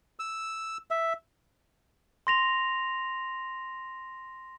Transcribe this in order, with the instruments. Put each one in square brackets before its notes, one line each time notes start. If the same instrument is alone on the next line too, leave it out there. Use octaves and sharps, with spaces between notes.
[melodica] E6
E5
[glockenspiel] C6 A#6 F7